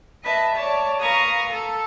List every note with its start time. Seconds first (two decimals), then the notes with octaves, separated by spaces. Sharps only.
0.23 B4 D#5 E5 A5
0.54 C#5 D5 A5
0.99 A#4 B4 F5 A#5 C#6 D#6
1.50 A4